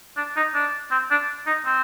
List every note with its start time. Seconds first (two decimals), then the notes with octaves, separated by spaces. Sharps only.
0.17 D4
0.36 D#4
0.54 D4
0.91 C4
1.11 D4
1.47 D#4
1.66 C4